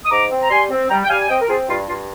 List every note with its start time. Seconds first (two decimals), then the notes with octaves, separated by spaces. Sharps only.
0.05 D#6
0.11 G#2 A#5 D6
0.31 C4
0.42 A#5
0.50 G3 G#5 C6
0.70 C4
0.89 G3 G5 A#5
1.03 G5
1.09 G3 F5 G#5
1.21 G#5
1.29 C4 D#5 G5
1.40 A#4
1.48 C4 F4 G#4
1.68 G2 F4
1.88 G2 F4